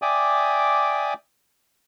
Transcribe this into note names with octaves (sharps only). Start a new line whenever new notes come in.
D5 E5 G5 G#5 D6 D#6